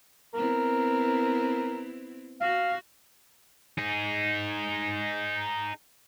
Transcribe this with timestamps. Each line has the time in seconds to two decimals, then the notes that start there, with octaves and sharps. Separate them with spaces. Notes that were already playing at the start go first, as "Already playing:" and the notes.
0.34 B3 C4 E4 A#4
2.41 F#4 F5
3.78 D#4 G#4